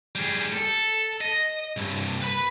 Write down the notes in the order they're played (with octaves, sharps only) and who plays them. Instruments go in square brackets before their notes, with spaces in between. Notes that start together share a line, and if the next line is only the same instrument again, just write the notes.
[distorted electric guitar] G3 G#4
A4
D#5
C2 G2
B4 B5